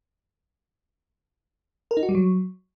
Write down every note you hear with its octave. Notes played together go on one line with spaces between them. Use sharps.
A#4
D#4
F#4
G3
F#3